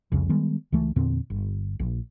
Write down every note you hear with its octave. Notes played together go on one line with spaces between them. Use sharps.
F1 C2 F2 C#3
D#3 G3 G#3 B3
C#2 E3 A3
E2 A#2 D3 C4
G1
A#1